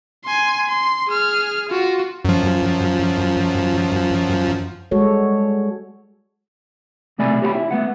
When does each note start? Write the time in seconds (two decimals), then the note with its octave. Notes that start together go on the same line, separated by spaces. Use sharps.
0.25 G#5 C6
0.68 C6
1.08 G#4 F6
1.70 F4 F#4
2.25 F#2 F3
4.91 G3 G#3 F#4 A4 C#5
7.18 B1 C3 A3 D5 G#5 B5
7.42 G4 C#5 D5 E5 G5 B5
7.55 E4
7.71 A3 B3 F#5